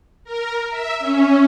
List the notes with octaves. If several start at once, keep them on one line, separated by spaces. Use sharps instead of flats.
A#4
E5
C#4